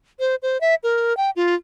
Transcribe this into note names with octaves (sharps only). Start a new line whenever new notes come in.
C5
C5
E5
A#4
G5
F4